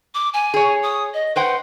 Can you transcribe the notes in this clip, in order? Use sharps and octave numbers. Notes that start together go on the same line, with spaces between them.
D6
G#5
G#4 C#5
D#6
D#5
B4 C5 F#5 G5